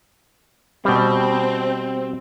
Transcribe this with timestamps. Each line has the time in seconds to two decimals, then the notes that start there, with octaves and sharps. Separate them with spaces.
0.85 B2 G3 C4